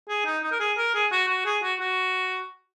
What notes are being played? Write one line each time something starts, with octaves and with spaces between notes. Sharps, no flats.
G#4
D#4
D#4
A#4
G#4
A#4
G#4
F#4
F#4
G#4
F#4
F#4